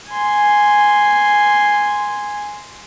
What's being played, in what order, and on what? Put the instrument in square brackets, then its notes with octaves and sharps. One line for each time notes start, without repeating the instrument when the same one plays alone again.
[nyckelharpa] G#5 C6